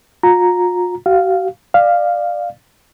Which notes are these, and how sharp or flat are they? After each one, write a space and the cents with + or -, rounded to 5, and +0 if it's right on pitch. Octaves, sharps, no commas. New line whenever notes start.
F4 +40 A#5 +0
F#4 +40 F5 -5
D5 +25 F5 +0